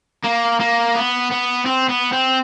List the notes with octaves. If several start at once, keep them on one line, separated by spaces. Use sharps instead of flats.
A#3
A#3
B3
B3
C4
B3
C4